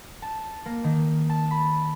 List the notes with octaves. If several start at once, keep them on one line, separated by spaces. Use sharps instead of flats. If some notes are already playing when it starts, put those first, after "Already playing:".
A5
A#3
D#3
A5
B5